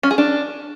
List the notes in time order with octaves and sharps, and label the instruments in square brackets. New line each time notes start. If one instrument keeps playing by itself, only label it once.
[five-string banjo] C#4
G#4
D4